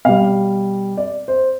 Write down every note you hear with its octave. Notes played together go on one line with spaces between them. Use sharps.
B2 G3 F5
D5
C5